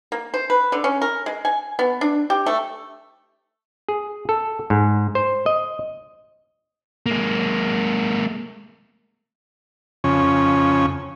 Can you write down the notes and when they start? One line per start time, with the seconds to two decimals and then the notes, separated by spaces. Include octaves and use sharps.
0.12 A#3
0.34 C5
0.50 B4
0.72 D3
0.84 C#4
1.02 A#4
1.26 G#3
1.45 G#5
1.79 B3
2.01 D4
2.30 G4
2.46 A3
3.89 G#4
4.29 A4
4.70 G#2
5.15 C5
5.46 D#5
7.06 G#3 A#3
10.04 F2 C#3 C#4